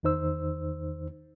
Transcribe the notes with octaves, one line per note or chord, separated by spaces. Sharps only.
E2 D#3 D#4 C5 E6